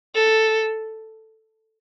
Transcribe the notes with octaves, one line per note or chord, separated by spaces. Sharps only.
A4